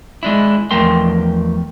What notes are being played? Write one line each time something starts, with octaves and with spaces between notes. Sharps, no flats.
G#3 D4 E4
E2 F3 A3 A#4 G5 C6